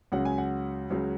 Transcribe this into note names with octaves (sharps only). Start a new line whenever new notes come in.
C#2 C#3 F#3 F#5
G#5
F#5
C#2 C#3 F#3